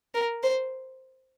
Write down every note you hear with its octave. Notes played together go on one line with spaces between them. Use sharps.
A#4
C5